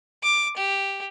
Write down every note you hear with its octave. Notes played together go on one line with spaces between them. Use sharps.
D6
G4